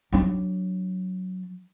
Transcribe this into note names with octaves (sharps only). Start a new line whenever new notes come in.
F#3 D4